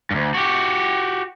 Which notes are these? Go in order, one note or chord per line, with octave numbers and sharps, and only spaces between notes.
D2 G2
F#4 G4